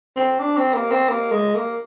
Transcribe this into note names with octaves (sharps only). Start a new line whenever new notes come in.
C4
D4
C4
A#3
C4
A#3
G#3
A#3